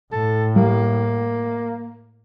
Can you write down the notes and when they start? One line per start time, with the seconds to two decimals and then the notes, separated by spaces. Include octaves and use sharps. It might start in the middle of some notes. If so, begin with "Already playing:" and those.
0.12 A2 A4
0.56 G3 A3 A#3